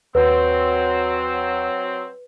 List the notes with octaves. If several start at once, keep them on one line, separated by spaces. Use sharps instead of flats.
D#2 F#3 C4 B4